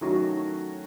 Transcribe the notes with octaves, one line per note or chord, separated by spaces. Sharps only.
D#3 F#3 A3 C#4 F#4